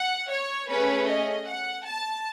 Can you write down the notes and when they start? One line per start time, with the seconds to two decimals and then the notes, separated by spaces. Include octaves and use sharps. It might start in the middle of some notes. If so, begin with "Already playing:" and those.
Already playing: F#5
0.31 C#5
0.70 A3 C#4 G#4 B4
1.10 D#5
1.48 F#5
1.87 A5